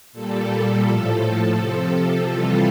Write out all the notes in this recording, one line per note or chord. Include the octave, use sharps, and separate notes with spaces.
A#2 G3 A4
A2 F3
C3 F3
C3 E3 G3 F4